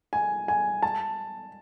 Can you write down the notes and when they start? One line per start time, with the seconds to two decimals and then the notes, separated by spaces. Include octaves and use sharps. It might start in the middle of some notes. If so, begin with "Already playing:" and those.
0.13 G#5
0.48 G#5
0.83 A5